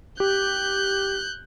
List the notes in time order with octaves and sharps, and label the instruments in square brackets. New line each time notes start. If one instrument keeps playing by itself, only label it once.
[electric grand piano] G4 [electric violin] F#6 G6